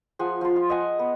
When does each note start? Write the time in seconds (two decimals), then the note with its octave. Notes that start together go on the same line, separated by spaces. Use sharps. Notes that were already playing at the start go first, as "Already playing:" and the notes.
0.19 F3 G#4 F#5 G#5
0.41 F3 C6
0.56 F4
0.70 D#5 F#5 G#5
0.99 B3